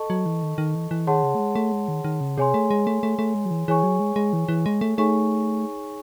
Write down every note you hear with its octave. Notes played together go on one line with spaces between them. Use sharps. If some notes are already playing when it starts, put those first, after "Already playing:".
Already playing: A4 D#5 A5 C#6
F#3
E3
D#3
D#3
E3
E3
D#3 G#4 C#5 F#5 A5 C6
C#3
A3
G#3
A3
G#3
D#3
D#3
C#3
C3 G#4 C#5 G#5 C6
A3
G#3
A3
A3
A3
G#3
F#3
E3
E3 G#4 C#5 G#5 C#6
F#3
G#3
G#3
E3
E3
G#3
A3
A3 D#4 G#4 C#5 G#5 C#6